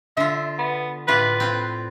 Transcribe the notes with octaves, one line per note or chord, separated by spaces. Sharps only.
D3 F4 E5
B3
A2 F4 B4 D5
C4 F4